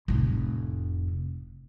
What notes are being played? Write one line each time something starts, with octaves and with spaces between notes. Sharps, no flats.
F1 A2